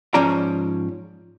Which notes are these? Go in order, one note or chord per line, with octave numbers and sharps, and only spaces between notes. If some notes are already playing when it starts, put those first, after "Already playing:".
G#2 F3 C#4 C#5 D5 A#5